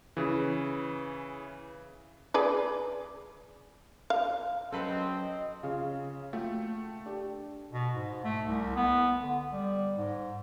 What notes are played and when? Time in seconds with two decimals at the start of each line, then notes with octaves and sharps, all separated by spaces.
0.17 C#3 E3
2.34 G#4 B4 D5
4.10 F5
4.72 F#3 C4 C#4 A4 B4 D#5 B5
5.63 C#3 F4 G#4 F5
6.33 A3 F4 F#4 G5
7.06 D4 G4 A4
7.73 B2
7.95 G#2
8.24 A3
8.46 C2
8.76 B3
9.18 D3
9.52 G3
9.96 G#2